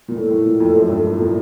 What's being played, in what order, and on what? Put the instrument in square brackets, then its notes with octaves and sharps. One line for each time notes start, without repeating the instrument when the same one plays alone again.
[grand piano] A#2
[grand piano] A2 [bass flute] A4
[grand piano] A2
A#2
F2
F#2
G2
A2
A#2